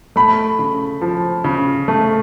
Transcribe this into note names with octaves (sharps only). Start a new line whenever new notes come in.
A3 B5
C#3
F3
C#3
A3